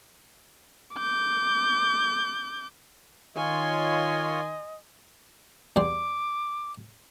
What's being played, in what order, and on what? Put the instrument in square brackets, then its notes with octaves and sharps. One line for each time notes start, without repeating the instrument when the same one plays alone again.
[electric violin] D6 G6
[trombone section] D#3 [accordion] F4 C#5 [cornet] D#5 [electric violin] G#5 C6
[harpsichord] E2 G3 C6 [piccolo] D6